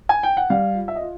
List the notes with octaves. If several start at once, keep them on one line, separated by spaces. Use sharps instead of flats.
G#5
G5
F#5
G3 F5
F4
E5
D#5
F4